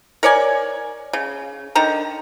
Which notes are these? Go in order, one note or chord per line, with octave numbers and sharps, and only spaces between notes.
A#4 C#5 D5 G#5
C#3
D3 D#3 A#5